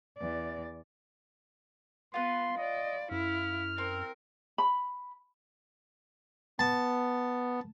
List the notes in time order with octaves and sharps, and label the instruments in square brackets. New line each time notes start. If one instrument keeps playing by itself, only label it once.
[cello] E2 D5
[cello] B3 [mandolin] F4 B4 [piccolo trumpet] C6
[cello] D5 [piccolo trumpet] D#5
[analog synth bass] F#2 [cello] E4 [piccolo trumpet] F6
[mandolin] C4 [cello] A#4
[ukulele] B5
[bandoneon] B3 [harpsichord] A5